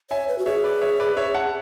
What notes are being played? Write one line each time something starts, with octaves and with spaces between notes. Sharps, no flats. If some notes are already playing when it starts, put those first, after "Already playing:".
C#5 E5 G#5
B4
F#4
G#4 C#5 E5
B4 D5
C#5 E5
B4 D5
C#5 E5
F#5 A5